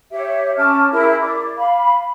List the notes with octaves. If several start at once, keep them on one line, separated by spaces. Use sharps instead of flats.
G4 C#5 E5
C#4 A5 D6 F6
E4 G#4 A#4
D5 D6
F5 B5